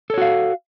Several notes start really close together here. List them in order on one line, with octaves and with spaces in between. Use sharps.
A4 C#5 F#4 F5